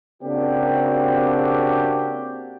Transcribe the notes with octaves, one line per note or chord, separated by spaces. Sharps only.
C#3 A#3 C4 D4 F#4 G4